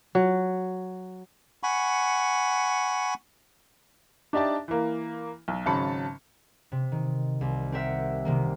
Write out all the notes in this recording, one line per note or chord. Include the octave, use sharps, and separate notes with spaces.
F#3
F#5 G#5 B5 C#6
D4 D#4 G4 D5 E5 A5
E3 A#3
B1
G#1 C#3 F#3 A5 B5 C#7
C3
D#3
C2
C4 G4 A#4 E5 F#5
C3 D#3 A#3